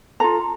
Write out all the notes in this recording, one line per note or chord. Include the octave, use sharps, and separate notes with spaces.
F4 A4 A#5